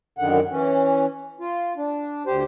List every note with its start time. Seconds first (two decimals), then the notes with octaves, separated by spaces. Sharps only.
0.18 F#2 D3 D#3 F#5
0.50 E3 C#4
1.40 F4
1.77 D4
2.26 D2 G4 C5